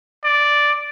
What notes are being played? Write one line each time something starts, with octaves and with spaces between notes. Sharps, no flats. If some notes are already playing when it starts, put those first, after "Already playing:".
D5